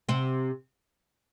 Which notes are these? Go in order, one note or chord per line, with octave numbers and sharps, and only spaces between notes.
C3 C4